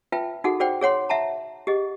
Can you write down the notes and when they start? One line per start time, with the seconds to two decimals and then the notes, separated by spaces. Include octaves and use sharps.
0.12 F4 B4 E5 G5 A5
0.44 D#4 F#4 G#4 A4 F#5
0.60 F#4 G#4 C5 D5 F#5 G5
0.81 G#4 C#5 F#5 C6
1.09 E5 F#5 A5 A#5
1.67 G4 G#4 D#5 F#5